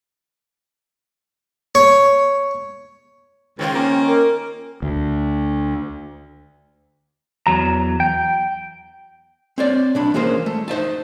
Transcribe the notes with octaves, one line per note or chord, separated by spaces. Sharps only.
C#5
C#2 D#3 C4 F4
A#3 C#4
A#4
D2
E2 F#3 A#5
G5
C4 C#5 D5
B1 D4 B5
E3 A#3 C#4 G#4 A#4 C5
A3
D#4 C5 E5 A5